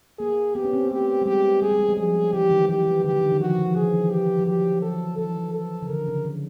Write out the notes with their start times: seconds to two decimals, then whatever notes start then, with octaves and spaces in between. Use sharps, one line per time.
0.19 A#3 G#4
0.55 B3 G4
0.64 C#4
0.73 C4
0.91 A3 G4
1.22 G3
1.26 G#3 G4
1.61 G3 G#4
1.71 G#3
1.79 G3
1.89 F#3
1.97 F3 G#4
2.33 E3 G4
2.51 D#3
2.69 E3 G4
2.87 D#3
3.04 D3 G4
3.13 D#3
3.22 D3
3.32 D#3
3.40 F3 F#4
3.49 D#3
3.59 E3
3.66 F3
3.76 D#3 G#4
3.94 E3
4.11 G4
4.39 F#3
4.47 F3 G4
4.82 A4
5.18 E3 A4
5.54 A4
5.82 C#3
5.89 D3 A#4
6.08 C#3
6.25 D3